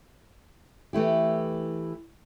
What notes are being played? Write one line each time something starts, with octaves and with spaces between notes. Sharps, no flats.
E3 A3 E4 G4